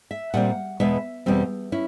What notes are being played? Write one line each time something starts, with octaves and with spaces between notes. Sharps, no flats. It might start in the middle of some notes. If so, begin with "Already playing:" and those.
E5
A#2 G3 C4 F#5
E2 B2 G#3 B3 E5
E2 B2 G3 C4
C#4 E4